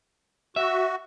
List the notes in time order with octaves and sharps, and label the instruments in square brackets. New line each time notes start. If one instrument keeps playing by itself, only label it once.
[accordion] F#4 [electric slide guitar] E5